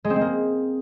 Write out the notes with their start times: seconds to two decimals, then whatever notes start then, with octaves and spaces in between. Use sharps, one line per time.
0.04 G#3
0.10 C4
0.16 G#3
0.21 A#3